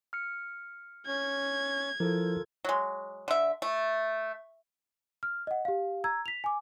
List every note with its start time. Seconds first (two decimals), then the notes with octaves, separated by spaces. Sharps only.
0.13 F6 C#7
1.07 C#4 G#6
2.00 F3 E4 F4 A4 A#4 C5
2.65 F#3 G#3
3.28 D3 E5
3.62 A3
5.23 F6
5.47 D#5 F#5
5.65 G4 F5
6.04 A#5 E6 G#6
6.26 B6 F7
6.44 G#5 D6